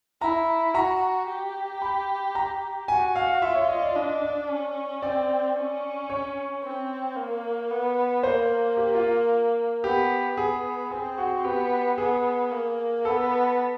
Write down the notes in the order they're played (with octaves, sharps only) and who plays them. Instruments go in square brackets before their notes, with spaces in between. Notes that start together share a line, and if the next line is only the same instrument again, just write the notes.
[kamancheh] E4 [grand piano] A#5
[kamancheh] F#4 [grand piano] A#5
[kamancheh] G4
[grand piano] B5
A#5
[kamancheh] F#4 [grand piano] G#5
[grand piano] F5
[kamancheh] F4 [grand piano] E5
[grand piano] C#5
D#5
D5
[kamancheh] D4 [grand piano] D#5
[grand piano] D5
[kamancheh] C#4
[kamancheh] C4 [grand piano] D5
[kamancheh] C#4
[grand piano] C#5
[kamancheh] C4
A#3
B3
[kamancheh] A#3 [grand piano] C5
[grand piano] G4
F4
[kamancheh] B3 [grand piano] G4
[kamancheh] B3 [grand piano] G#4
[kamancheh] C4 [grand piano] G#4
[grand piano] F#4
[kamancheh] B3 [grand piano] G4
[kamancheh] B3 [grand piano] G#4
[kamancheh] A#3
[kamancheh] B3 [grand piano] A4